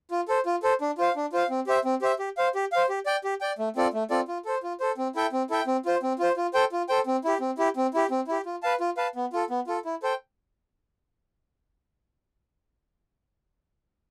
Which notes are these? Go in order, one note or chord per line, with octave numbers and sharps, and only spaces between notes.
F4
A4 C5
F4
A4 C5
D4
F4 C5 F5
D4
F4 C5 F5
C4
G4 C5 E5
C4
G4 C5 E5
G4
C5 F5
G4
C5 F5
G4
D5 G5
G4
D5 G5
A3
C4 F4 A4 D5
A3
C4 F4 A4 D5
F4
A4 C5
F4
A4 C5
C4
E4 A4 E5 G5
C4
E4 A4 E5 G5
C4
F4 C5
C4
F4 C5
F4
A4 C5 G5
F4
A4 C5 G5
C4
E4 G4
C4
E4 G4
C4
E4 G4
C4
E4 G4
F4
B4 F5 A5
F4
B4 F5 A5
B3
F4 A4
B3
F4 A4
E4
A4 C5 G5